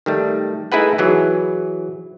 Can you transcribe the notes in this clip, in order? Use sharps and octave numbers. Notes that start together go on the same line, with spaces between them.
D#3 G3 A3
A3 D#4 E4 G#4 B4 F#5
E3 F#3 G#4